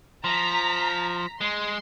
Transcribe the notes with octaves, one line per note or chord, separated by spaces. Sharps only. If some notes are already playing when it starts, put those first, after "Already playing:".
F3 A#5 B6
G#3 C6